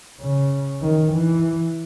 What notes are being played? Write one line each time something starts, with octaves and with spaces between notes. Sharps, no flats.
C#3
D#3
E3